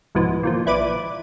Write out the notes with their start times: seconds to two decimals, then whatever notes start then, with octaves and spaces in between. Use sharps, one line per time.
0.15 C2 G#2 B2 E3 F3
0.43 A#2 D#3 F3
0.66 A#1 E4 B4 D5 D6 D#7